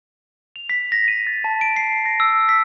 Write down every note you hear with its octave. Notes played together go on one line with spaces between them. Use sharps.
F7
B6
A#6
D#7
A6
A5
D7
C7
A#6
E6
B6